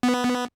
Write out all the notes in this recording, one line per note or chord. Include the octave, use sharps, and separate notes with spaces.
B3